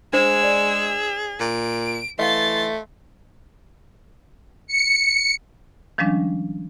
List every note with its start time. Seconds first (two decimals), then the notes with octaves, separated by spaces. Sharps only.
0.13 G#3 D4 G#4 C5 E6
0.43 D5
1.40 A#2 D7
2.19 E3 A3 D#5 F5 C6 A6
4.67 C#7
5.98 D#3 F3 G3 G#3 C#4 D4